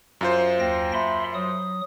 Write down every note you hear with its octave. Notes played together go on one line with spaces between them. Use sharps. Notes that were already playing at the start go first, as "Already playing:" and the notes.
F#2 F4 C5
D#2 G5 A#6
E5 B5 C6
F#3 D#6